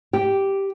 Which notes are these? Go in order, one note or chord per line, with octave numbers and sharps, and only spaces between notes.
G4